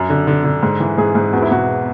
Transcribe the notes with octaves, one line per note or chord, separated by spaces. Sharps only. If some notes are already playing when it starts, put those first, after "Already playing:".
Already playing: F#2
D3
D3
D3
G#2
E3
G#2 G#4
G#2
E2 F#4
E4
B2 F#4